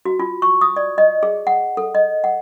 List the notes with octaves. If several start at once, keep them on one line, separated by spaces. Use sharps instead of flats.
F#4
F4
C#6
D#6
D5
D#5
G#4
F#5
A4
D#5
F#5